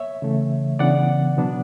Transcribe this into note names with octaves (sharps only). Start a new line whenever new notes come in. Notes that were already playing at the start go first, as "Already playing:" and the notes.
Already playing: C#5 E5
C#3 E3 A3
C#3 E3 B3 D4 D5 F#5
B2 F#3 B3 D4